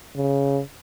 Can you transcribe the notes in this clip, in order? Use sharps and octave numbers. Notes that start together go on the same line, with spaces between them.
C#3